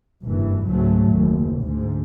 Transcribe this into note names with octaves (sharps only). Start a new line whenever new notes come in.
F#1 G2 E3
C#2 G#2 F#3 A3
F#1 D#2
D2 G#2